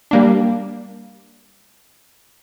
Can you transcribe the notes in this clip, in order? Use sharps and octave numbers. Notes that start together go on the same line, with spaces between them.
G3 A#3 D4